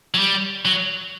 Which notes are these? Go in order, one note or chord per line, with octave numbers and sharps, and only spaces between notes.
F#3
G3
F#3